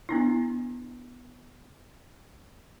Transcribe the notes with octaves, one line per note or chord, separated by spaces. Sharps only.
B3 D4 E4